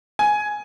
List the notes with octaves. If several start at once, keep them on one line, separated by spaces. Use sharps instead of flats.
G#5